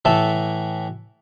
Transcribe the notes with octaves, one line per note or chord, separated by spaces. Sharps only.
A2 E3 A4